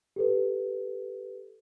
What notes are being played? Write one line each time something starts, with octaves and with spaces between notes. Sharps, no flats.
G4 A4 B4